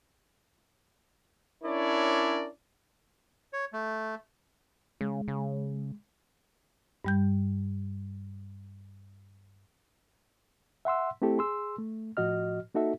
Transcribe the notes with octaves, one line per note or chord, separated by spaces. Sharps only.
C#4 D4 E4 A#4 C#5 D5
C#5
A3
C#3 G#3
C#3
G2 G3 G6
E5 F#5 C6 E6
A3 C4 E4 G4 A4
G#4 C6 E6
A3
A2 F3 F#4 D#5 F6
A#3 D#4 F#4 A4 E5